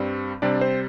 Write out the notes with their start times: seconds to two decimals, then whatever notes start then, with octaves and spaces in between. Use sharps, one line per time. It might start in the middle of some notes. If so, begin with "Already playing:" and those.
Already playing: G2 G3 C4
0.42 C3 G3 C4 D4 D5
0.61 C4 C5